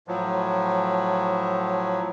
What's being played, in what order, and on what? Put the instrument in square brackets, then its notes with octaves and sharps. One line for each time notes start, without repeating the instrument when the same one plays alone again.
[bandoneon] A2 F3 F#3